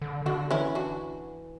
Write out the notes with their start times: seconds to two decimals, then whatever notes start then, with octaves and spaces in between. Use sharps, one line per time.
0.02 D3
0.26 D3 D4 F#4
0.51 E3 C#4 E4
0.75 D4 F#4